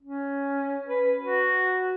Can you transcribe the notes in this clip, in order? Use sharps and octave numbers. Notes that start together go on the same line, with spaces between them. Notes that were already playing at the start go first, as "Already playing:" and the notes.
C#4
B4
F#4